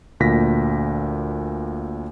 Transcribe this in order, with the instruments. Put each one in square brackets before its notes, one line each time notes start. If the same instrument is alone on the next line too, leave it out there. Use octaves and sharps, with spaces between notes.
[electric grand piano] D2 A#2 A#6 B6